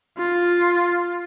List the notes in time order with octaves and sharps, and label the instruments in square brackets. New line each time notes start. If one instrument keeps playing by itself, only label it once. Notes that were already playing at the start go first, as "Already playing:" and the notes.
[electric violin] F4